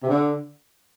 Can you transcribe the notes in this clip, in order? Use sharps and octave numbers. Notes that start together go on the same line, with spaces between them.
C3
D3